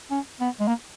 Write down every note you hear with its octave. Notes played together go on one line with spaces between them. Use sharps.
C#4
B3
G#3
A#3